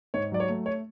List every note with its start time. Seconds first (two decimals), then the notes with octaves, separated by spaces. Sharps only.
0.14 G#2 C#5
0.32 F#3 D5
0.40 C#5
0.49 A3
0.66 C#5